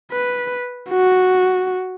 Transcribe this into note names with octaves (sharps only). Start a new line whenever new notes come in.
B4
F#4